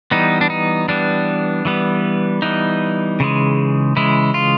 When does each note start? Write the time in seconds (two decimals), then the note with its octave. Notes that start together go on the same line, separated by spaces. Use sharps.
0.11 E3 G3 B3 D#4
0.41 D4
0.50 D#4
0.88 E3 G3 B3 D4
1.65 E3 G3 B3
2.42 E3 G3 B3 D#4
3.20 C#3 E3 G#3
3.96 C#3 E3 G#3 E4
4.34 F4